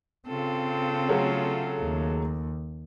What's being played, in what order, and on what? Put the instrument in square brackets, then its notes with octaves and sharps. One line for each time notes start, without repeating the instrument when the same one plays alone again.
[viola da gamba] C#3 F4 A4 [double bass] C4
[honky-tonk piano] F#3 A3 G#4
[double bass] D#2